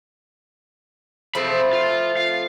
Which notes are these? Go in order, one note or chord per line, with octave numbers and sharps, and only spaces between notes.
F3 A3 C4 F5 B5
F4
F5